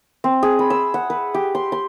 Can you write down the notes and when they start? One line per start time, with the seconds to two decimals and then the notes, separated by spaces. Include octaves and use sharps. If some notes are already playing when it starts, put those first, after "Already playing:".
0.24 C4
0.43 G#4
0.59 B5
0.70 E6
0.94 F#5
1.10 B4
1.34 G4
1.55 C6
1.72 C6